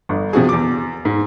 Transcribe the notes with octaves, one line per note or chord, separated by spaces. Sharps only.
G1
C3 F3 F#4 G#4
E2 D6
G#2